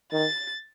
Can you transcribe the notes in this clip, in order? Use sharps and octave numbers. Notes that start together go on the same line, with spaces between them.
D#3 A6